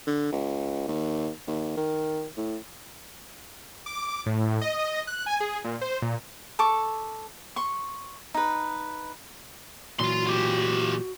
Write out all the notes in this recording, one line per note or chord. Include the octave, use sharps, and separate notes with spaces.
D3
C#2
D#2
D#2
D#3
A2
D6
A2
D#5
F#6
G#5
G#4
A#2
C5
A#2
A4 C#6 D6
C6 C#6
D#4 B4
A#2 E3 F#3 F4 F#4 C6
F4 G4